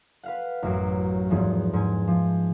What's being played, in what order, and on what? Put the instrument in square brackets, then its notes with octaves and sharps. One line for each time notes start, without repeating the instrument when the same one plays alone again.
[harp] B4 F5 F#5
A1 F#2 D7
E2 G#2 E3 F3 B3
G#2 G#5
F3